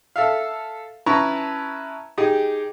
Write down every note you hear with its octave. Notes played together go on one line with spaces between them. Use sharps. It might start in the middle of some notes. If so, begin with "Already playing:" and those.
A4 E5 F5
C#4 E4 B4 A5 A#5 C#6
D#4 G4 G#4